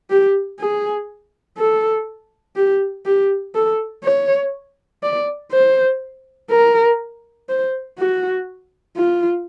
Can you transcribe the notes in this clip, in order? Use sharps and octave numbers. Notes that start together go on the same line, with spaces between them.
G4
G#4
A4
G4
G4
A4
C#5
D5
C5
A#4
C5
F#4
F4